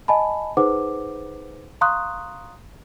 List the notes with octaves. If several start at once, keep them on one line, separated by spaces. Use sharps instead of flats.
D#5 G#5 A5 B5
D#4 G#4 B4 C5 F#5 D6
F5 A#5 C6 C#6 D#6 F#6